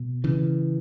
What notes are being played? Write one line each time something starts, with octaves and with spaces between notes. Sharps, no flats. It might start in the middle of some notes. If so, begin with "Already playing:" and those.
Already playing: B2
C#3 E3